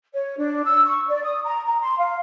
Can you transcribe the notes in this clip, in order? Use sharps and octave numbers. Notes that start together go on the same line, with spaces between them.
C#5
D4
E6
C#6
D5
D#6
A#5
A#5
C6
F5